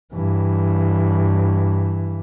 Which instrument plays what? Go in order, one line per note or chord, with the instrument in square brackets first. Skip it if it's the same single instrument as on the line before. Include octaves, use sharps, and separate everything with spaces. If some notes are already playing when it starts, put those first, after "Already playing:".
[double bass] G2 E3